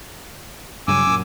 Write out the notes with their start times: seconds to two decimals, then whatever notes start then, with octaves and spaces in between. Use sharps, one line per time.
0.88 G2 C#3 F#3 G#5 D6 E6
1.06 F#2 A#2